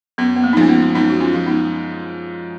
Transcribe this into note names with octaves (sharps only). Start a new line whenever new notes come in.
F#2 B3
B3
A#3
D#4
F3 G#3 C#4
B3
F#2 B3 D#4
F#4
C#4 F4
F3 G#3
B3 D#4